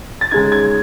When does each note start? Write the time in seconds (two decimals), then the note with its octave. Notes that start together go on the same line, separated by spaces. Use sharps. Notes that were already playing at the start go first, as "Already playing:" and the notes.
0.21 A6
0.31 C#3 G#3 D#4 G#6
0.52 G#6